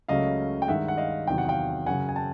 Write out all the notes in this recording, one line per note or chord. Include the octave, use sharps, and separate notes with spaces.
C#2 C#3 F#3 A3 C#4 D#5 F5
G5
G2 D#3 G#3 E5 F#5
F#5
D#5 F5
E2 C3 D#3 F#3 G5
F#5
F5 G5
F#2 C#3 F#3 F#5 G#5
G#5
G5 A5